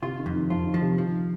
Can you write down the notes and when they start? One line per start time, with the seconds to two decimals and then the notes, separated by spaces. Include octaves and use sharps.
0.02 C3 F4
0.19 D#3
0.26 F2
0.35 D#3
0.50 F3 F4
0.66 D#3
0.74 F3
0.81 C3
0.97 D#3 F3